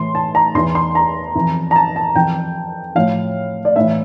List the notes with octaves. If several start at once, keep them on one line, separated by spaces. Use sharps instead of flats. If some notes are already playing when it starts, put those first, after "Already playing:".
Already playing: A2 E3 C6
A5
A#5
E2 E3 C6
C6
A#5
F2 E3
A#5
A5
A5
F2 E3 G5
A2 F3 F5
D5
A2 E3 E5